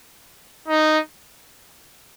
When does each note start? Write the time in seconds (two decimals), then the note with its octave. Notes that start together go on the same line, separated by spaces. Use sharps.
0.68 D#4